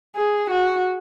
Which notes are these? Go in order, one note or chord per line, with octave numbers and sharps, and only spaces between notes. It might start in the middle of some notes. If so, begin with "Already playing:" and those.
G#4
F#4